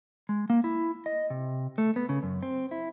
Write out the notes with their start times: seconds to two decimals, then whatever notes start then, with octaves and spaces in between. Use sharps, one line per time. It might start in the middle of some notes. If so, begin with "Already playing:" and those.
0.29 G#3
0.50 A#3
0.64 E4
1.06 D#5
1.30 C3
1.78 A3
1.96 B3
2.09 C#3
2.23 F#2
2.43 C4
2.71 E4